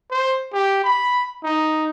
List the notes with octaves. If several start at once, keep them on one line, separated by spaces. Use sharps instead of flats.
C5
G4
B5
D#4